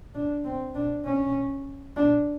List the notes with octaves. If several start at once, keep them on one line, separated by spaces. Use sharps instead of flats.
D4
C4
D4
C#4
D4